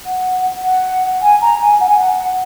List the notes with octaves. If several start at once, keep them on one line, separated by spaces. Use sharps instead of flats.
F#5
F#5
G#5
A#5
G#5
F#5
G#5
F#5